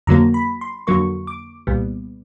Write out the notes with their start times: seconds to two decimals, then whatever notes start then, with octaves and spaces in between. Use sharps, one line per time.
0.07 F2 D3 F#3 A#3 A#5
0.34 B5
0.61 C6
0.87 F2 D3 F#3 A#3 C#6
1.27 D6
1.67 C2 A#2 G3 B3